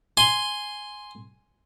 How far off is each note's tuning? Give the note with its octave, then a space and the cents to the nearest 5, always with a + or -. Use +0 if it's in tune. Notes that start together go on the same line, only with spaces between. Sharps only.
G#5 +0 C6 +0